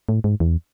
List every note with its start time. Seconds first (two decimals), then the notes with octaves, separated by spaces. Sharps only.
0.09 A2
0.24 G#2
0.40 E2